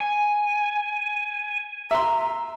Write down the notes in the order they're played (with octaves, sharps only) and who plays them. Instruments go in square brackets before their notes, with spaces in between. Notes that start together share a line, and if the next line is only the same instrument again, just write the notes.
[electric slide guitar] G#5
[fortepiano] E5 C6 [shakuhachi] A#5